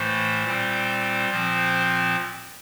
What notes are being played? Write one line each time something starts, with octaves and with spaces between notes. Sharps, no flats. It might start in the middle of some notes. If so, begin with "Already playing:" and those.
Already playing: A2 E3 A3 C5
A#2 G3 C4
A#2 F3 C4